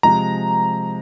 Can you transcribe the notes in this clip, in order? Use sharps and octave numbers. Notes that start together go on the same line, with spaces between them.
C3 F3 G#3 A#5